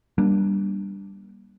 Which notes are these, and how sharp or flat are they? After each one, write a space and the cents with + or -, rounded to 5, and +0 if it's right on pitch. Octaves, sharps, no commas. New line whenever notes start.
G3 +0 A#3 +30 D4 +0